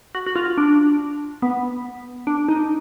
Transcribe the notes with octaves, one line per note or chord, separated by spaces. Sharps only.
F#4
F#4
F4
D4
B3
D4
D#4